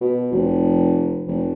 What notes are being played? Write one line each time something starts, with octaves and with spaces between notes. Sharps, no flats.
B2
F1
F1